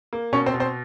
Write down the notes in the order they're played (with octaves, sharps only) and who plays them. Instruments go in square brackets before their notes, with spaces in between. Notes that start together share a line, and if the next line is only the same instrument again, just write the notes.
[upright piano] A#3
B2 C#4 C#5
C4 C5
B2
C4 C5